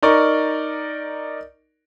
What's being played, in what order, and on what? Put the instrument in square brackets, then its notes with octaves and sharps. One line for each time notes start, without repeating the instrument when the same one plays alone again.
[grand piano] D#4 A#4 D5 C#6